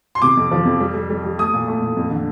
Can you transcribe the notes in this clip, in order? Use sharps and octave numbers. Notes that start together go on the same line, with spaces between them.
C6
C3 D6
F2
F3
F2
G3
G3
G3
G3
A3 D#6
A#2
A3
A#2
F2
D3